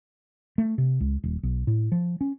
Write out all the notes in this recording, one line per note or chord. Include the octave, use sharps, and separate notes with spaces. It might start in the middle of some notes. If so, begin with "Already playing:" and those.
A3
C3
C#2
D#1
B1
A2
F3
C#4